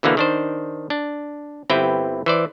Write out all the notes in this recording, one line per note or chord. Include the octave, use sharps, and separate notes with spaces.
B2 D3 E3 A#3 B3
D#3 D4 C5
D4
G1 C4 E4 G4 B4 G5
E3 C5 D5